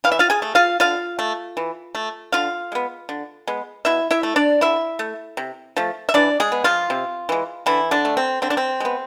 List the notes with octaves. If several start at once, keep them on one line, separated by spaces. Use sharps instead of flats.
E3 F5
E5
F4 F5
G#4 G#5
A3
F4 F5
D3 F4 F5
A3
E3
A3
D3 F4 F5
G#3 B3
D3
G#3 B3
B2 E4 E5
E4 E5
A3
D4 D5
D3 E4 E5
A3
C3
F3 A3
E5
E3 D4 D5
G#3 G#4
B3
F3 F4
C3
E3 G#3
D3 E3 E4
D3 D4
A3
C4
D3 C4
D4
C4
G#3 B3